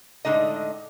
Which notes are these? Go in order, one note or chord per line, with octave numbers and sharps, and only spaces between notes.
A2 D3 G#3 D#4 D#5